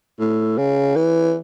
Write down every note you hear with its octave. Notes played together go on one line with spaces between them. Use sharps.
A2
C#3
E3